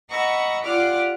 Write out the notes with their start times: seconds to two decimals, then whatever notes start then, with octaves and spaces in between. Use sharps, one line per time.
0.10 D#5 F#5 A#5 B5 C#6 E6
0.64 F4 G4 D5 F#5 D6 F6